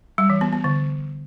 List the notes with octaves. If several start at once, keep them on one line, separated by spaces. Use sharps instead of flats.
G3
E3
B3
B3
D3